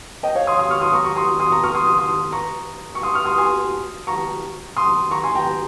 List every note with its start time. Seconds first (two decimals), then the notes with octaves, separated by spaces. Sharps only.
0.23 D#5 G5
0.35 C#5 F5
0.47 C6 D#6
0.59 C6 D#6
0.70 C#6 F6
0.81 C6 D#6
0.93 A#5 C#6
1.05 A#5 C#6
1.16 C6 D#6
1.40 C6 D#6
1.52 A#5 C#6
1.63 C#6 F6
1.75 C6 D#6
1.87 C6 D#6
1.98 C6 D#6
2.32 A#5 C#6
2.95 C#6
3.03 C6 D#6
3.14 C#6 F6
3.25 C6 D#6
3.38 G#5 C6
4.07 A#5 C#6
4.77 C6 D#6
5.11 A#5 C#6
5.23 G#5 C6
5.35 G5 A#5